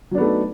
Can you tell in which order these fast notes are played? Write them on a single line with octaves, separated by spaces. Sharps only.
F#3 D4 B3 A3 D#4